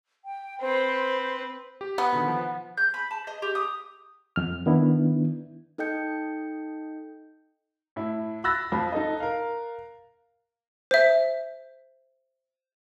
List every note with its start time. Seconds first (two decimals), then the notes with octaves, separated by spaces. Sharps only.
0.25 G5
0.61 C4 B4 C5
1.81 G4
1.98 B3 F#5 D#6
2.12 B2 D3 D#3
2.28 F3
2.77 G6
2.94 B5
3.11 A5
3.27 D#5
3.42 G4
3.55 D#6
4.36 F2 F6
4.66 D#3 B3 D4 E4
5.78 D#4 A4 D#5 G5 G6 C#7
7.96 A2 E4
8.44 B5 E6 F#6 A6 A#6
8.72 F2 F3 B5
8.92 D#4 A4 D#5
9.20 A#4 F5
10.91 C5 E5